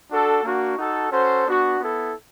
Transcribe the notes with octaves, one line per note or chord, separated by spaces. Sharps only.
D4 F#4 A4
A#3 D4 F#4
D#4 F#4 A4
C#4 F#4 A4 C5
B3 D4 F#4
B3 E4 A4